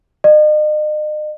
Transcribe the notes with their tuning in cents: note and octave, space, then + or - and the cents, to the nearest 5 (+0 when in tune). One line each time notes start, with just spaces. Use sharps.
D#5 -40